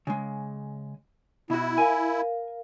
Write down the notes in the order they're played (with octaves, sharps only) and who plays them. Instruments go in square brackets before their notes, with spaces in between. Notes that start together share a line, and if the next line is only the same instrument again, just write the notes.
[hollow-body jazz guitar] C#3 G#3
[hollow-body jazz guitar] B2 F#4 [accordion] E4
[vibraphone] A#4 F5 [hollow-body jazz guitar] G#5